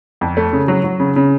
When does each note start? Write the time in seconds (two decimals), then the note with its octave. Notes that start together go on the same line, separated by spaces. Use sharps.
0.21 F2
0.37 A3
0.53 C#3
0.68 F#3
0.84 F#3
1.00 C#3
1.16 C#3